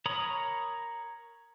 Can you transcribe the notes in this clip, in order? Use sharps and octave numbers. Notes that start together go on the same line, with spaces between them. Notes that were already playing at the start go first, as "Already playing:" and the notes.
A#4 C#5 A#5 B5 D#6